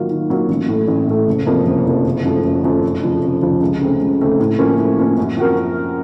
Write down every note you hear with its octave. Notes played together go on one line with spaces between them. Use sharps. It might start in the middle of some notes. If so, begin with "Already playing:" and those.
Already playing: D#3 F#3 A#3 F4
D#3
F#3 A#3 F4
A1
A2 A3
A1
A2 A3
F#1
F2 C3 F3 A#3
F#1
F2 C3 F3 A#3
F#1
F#2 F3 A3
F#1
F#2 F3 A3
F1
F2 C#3 F3
F1
F2 C#3 F3
C#2
C#3 A3 C4
C#2
C#3 A3 C4
A2
F3 A#3 C#4
A2
F3 A#3 C#4
F#2
F3 C4 F#4 A#4